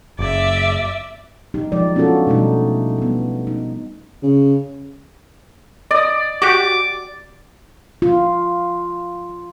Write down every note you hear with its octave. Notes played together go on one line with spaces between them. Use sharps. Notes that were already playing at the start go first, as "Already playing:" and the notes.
F#1 D5 E5
F#3 D#4 G4
F3 F#3 G#3 D#4 D5
B3 C#4 D4 F4 F#4 A4
B2 E3 G3 A3 D#4
G3 B3
D#4
C#3
D5 D#5 D#6
F#4 G4 D6
F4